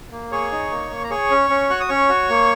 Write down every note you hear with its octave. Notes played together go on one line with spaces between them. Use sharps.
A#3
G#4 C#5 C#6
D#4
A#3
A#3
A#5
G#4 C#5 C#6
C#4
C#4
F#4 F#6
D#6
C#4 C#5 C#6
F#4
A#3